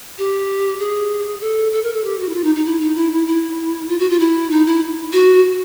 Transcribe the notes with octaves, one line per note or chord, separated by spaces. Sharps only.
G4
G#4
A4
A4
A#4
A4
G4
F#4
E4
F4
D#4
D#4
E4
D#4
E4
E4
E4
F4
F#4
F4
E4
D#4
E4
F#4